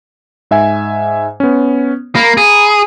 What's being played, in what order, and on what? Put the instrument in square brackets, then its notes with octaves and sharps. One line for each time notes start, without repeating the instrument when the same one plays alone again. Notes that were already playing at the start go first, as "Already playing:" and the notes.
[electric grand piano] G#2 E5 G#5
B3 C#4
[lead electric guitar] A#3 [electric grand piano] A#5 B5
[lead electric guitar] G#4